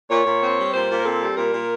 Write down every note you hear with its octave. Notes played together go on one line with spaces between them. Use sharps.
A#2 C#5
A#2
C4
G3
A#2 C5
A#2
A#4
C4 A4
G3
A#2 A#4
A#2